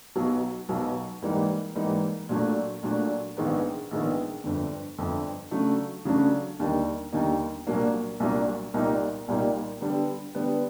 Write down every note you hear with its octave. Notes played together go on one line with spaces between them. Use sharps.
B1 B2 F#3
B1 B2 F#3
G#2 E3 G3 A#3 D#4
G#2 E3 G3 A#3 D#4
A#2 F#3 A3 D4
A#2 F#3 A3 D4
A#1 G#2 D#3 G#3 B3
A#1 G#2 D#3 G#3 B3
G1 F2 D3
G1 F2 D3
C#3 F#3 A3 D4
C#3 F#3 A3 D4
D#2 D3 G3 A#3 D#4
D#2 D3 G3 A#3 D#4
C2 A#2 F#3 A#3 D4
C2 A#2 F#3 A#3 D4
C2 A#2 G3 A#3 D#4
C2 A#2 G3 A#3 D#4
D3 G3 B3
D3 G3 B3